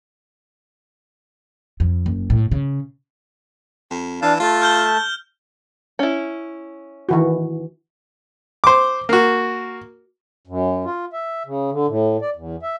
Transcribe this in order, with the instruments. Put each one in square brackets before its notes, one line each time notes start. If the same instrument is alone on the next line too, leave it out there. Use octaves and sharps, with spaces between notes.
[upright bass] F2
F#1
A2
C#3
[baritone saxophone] F2
[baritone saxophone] E3 [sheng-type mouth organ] D4 F5 A5
[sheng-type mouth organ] A3 A5 [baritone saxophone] F4
[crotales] F6 G6 G7
[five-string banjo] C#4 E4
[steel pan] D#3 E3 F#4
[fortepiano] C5 D6
A#3 F#4
[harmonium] F#2
F4
E5
C#3
D3
A2
D5
E2
E5